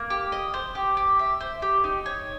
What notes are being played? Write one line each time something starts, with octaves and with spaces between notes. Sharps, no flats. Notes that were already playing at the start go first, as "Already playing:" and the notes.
Already playing: A#3
G4
D#5
C5
G4
G4
E5
C5
G4
D#4
C#5